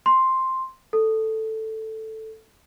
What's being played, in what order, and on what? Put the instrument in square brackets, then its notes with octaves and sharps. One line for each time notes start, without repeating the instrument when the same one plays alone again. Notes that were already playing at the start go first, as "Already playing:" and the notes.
[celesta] C6
A4